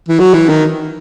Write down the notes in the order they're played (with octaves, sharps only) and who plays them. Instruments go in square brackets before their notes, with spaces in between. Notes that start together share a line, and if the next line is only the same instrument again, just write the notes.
[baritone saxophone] E3
F#3
E3
D#3